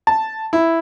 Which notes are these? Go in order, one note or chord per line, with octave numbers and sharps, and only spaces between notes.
A5
E4